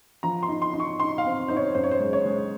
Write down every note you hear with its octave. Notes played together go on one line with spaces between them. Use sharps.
F3 A#5
C6
D#4
C6
D#4
C#6
D#4 C6
F5
C4
D#4 C5
C#5
F#2 C5
C#5
C5
G#3
C#5
G#3